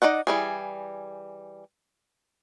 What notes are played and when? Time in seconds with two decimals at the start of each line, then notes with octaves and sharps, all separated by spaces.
0.02 D#4 D5 D#5 F#5
0.27 E3 G3 G#4